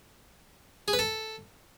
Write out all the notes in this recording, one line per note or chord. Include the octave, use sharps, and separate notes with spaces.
G#4
B4
A4